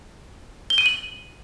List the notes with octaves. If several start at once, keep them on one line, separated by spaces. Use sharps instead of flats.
G7
D#7
F#7